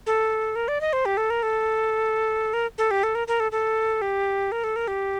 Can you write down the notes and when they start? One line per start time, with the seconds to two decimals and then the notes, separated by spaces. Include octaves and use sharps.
0.06 A4
0.56 A#4
0.68 D5
0.81 D#5
0.93 C5
1.05 G4
1.17 A4
1.30 A#4
1.43 A4
2.53 A#4
2.78 A4
2.91 G4
3.03 A4
3.15 A#4
3.28 A#4
3.40 A4
3.52 A4
4.02 G4
4.52 A#4
4.64 A4
4.76 A#4
4.88 G4